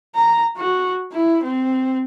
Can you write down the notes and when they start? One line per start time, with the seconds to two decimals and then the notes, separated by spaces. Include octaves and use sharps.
0.15 A#5
0.57 F#4
1.12 E4
1.44 C4